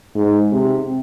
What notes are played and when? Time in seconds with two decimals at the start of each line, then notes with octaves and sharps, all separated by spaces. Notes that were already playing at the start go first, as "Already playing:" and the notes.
0.15 G#2
0.52 C3